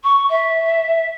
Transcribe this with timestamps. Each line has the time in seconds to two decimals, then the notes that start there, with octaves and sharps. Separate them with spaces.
0.03 C#6
0.30 E5